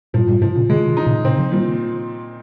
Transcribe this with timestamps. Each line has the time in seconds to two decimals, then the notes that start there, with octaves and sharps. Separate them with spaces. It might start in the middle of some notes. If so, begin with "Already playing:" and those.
0.14 G2 A#2 F3
0.28 G2 A#2
0.42 G#2 C3 F3
0.55 A#2 C#3
0.70 C3 D#3 G#3
0.88 C3 D#3
0.97 D#4
1.06 A#2 C#3
1.24 A#2 C#3 C4
1.38 C#3 F3
1.52 A#2 D#3 G3